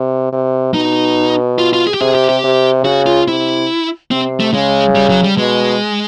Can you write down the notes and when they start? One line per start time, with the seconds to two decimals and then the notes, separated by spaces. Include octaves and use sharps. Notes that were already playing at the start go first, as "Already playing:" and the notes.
Already playing: C3
0.32 C3
0.74 B2 D#4
1.59 F4
1.73 F4
1.87 G#4
1.94 G4
2.01 C3 G#4
2.15 G4
2.29 G4
2.43 C3
2.85 C#3 F#4
3.06 F4
3.28 C3 E4
4.11 C3 C4
4.40 A3
4.53 C#3 G#3
4.95 G3
5.09 F#3
5.24 G3
5.37 B2 G#3